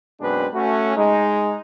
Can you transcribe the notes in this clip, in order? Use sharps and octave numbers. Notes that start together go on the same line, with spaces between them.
F#2 B2 G#3 C4 D4 B4
A3 C#4 F#4
G#3 D#4